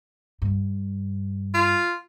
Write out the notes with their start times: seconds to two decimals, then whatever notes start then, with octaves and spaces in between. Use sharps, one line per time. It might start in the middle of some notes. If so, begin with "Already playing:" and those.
0.42 G2
1.54 F4